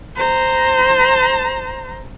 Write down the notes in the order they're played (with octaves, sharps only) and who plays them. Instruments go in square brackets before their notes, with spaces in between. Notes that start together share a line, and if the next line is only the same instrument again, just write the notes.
[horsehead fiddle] C5 A#5